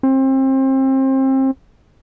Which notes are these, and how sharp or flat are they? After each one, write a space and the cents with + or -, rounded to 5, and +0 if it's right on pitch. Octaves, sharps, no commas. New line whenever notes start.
C4 +30